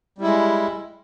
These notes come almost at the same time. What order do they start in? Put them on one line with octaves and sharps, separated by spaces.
G3 E4 G#3